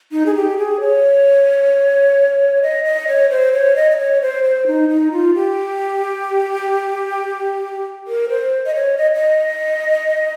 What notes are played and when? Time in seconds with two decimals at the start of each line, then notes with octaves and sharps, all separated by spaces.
0.12 D#4
0.26 G#4
0.36 G4
0.58 G#4
0.81 C#5
2.62 D#5
2.84 D#5
3.08 C#5
3.30 C5
3.53 C#5
3.76 D#5
3.91 D#5
3.98 C#5
4.22 C5
4.43 C5
4.67 D#4
4.89 D#4
5.12 F4
5.35 G4
8.07 A#4
8.29 C5
8.66 D#5
8.75 C#5
8.97 D#5
9.16 D#5